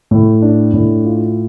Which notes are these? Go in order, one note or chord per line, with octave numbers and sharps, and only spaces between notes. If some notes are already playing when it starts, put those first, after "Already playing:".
A2
D4
A2
F4